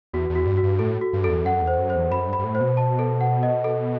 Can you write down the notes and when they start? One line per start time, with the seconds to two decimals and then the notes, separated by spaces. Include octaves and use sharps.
0.13 E2 F#4
0.30 E2
0.35 F#4
0.46 G2
0.58 F#4
0.63 G2
0.79 A2 A4
1.01 F#4
1.13 G2
1.24 F#2 A4
1.29 E2
1.45 F#2 F#5
1.61 E2
1.68 C5
1.78 F#2
1.90 C5
1.95 E2
2.11 F#2 B5
2.28 G2
2.33 B5
2.39 G2
2.44 A2
2.55 C5
2.61 B2
2.77 A5
2.99 A4
3.21 F#5
3.43 D#5
3.64 A4